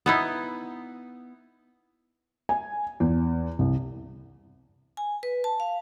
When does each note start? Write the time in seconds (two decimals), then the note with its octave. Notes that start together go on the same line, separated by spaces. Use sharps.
0.06 B3 D#4 E4
2.49 G#5
3.00 E2
3.59 C2
4.97 G#5
5.23 B4
5.44 A5
5.60 F5